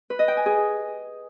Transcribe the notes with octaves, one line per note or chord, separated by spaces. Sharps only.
B4
D#5
G5
G#5
G#4